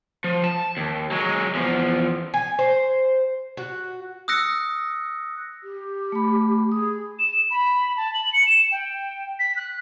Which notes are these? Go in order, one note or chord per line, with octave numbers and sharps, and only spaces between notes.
F3
A5
D#2
F#3 G#3
E2 F3
G#5
C5
F#4
D#6 E6 F#6 A#6 C#7
G4
A3 B5
G#4 D#6
E7
B5
A5
F#7
C#7
E7
G5
B6
F#6